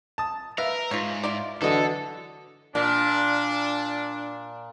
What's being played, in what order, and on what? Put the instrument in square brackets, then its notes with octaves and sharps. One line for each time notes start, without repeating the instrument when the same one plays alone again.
[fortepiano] A5 D#6
[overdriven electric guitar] A#4 [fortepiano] B4 E5 [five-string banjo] F5
[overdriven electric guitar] G#2 [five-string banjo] F4 C#5
[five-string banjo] E4 F4 D5
[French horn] D3 [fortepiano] E3 F#3 [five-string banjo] F#4 D#5 [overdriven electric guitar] A4
[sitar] A#2 [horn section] D4